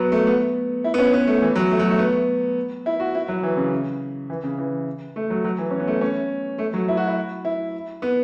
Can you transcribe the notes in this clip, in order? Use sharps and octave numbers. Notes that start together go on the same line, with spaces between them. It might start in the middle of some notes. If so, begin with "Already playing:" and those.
Already playing: F#3 B3
A3
B3
E4
B3
C#4
B3
A3
E3
F#3
A3
F#3
A3
B3
E4
F#4
E4
F#3
E3
C#3
E3
C#3
E3
A3
F#3
F#3
E3
C#4
B3
A3
C#4
A3
F#3
E4
F#4
E4
E4
B3